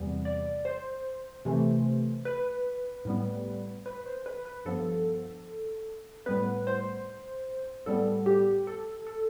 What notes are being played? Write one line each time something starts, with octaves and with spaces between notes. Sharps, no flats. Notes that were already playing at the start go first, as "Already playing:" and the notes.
Already playing: E2 C3 E3 G3 B3
D5
C5
C3 E3 A3
B4
A2 G3 B3
B4
C5
B4
B4
G2 F3 B3 A4
A2 G3 B3 B4
C5
A2 G3 B3 A4
G4
A4
A4